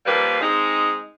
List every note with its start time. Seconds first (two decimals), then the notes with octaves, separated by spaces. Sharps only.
0.05 D#2 F3 G3 A#3 G4 B4
0.41 G#3 C4 D#4